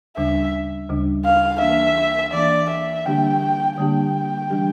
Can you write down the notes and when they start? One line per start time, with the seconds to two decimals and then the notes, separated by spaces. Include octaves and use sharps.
0.17 D2 C#3 G3 D4 E5
0.89 D2 C#3 G3 D4
1.25 F5
1.61 E3 A#3 D4 E5
2.33 E3 A#3 D4 D5
2.70 E5
3.05 D3 G3 A#3 D4 G4 G5
3.77 D3 G3 A#3 D4 G4 G5
4.50 E3 G3 D4 G4